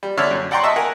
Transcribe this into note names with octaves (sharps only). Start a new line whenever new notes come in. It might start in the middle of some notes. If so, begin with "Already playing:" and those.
G3
D3 C#5 D5 E5 E6 F6
F#2
D5 F#5 G5 A#5 C6 C#6
D#5 E5 A5 C#6 E6
A#4 F#5 G#5